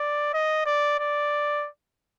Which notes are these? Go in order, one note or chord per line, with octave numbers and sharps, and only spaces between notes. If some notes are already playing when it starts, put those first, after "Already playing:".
Already playing: D5
D#5
D5
D5